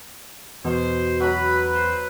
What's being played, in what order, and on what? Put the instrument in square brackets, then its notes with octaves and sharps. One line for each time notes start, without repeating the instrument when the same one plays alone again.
[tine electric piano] E2 [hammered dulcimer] B2 [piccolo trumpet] C5
[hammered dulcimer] F#3 A#5 [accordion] B4 [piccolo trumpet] B5
[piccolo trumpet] C5